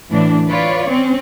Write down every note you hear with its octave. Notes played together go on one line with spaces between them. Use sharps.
A2 D3 E3 D4
F4 B4 C#5 D5
C4 C#4